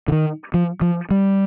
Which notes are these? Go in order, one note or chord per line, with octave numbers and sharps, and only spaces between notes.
D3
D#3
F3
F3
G3